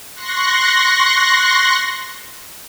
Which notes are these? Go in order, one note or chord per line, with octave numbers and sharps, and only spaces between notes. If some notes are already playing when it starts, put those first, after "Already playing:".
C6 C#6 F#6 A#6